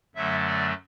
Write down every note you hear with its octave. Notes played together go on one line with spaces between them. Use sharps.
F#2 D3 F#3 A3 E5
D5